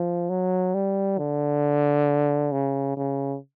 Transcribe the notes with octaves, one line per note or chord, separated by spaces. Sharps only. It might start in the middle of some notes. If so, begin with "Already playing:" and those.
Already playing: F3
F#3
G3
D3
C#3
C#3